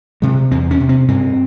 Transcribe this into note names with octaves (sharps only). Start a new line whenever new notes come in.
C3 G#3
E2 C4
C#4
C3
C4
G2 C4